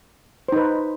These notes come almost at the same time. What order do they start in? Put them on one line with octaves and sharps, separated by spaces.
C5 D#4 B4